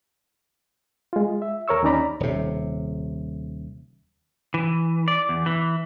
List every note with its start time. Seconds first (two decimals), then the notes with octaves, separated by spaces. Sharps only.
1.13 G#3 F4
1.42 E5
1.68 D#2 A#4 C#5 C#6 E6
1.83 D#2 C#4 D#4 D5 A#5 B5
2.20 D#1 C3
4.54 E3
5.08 D5
5.29 E2
5.46 E3